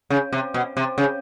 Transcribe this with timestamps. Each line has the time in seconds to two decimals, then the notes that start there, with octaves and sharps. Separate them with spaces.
0.10 C#3
0.33 C3
0.54 B2
0.77 C3
0.98 C#3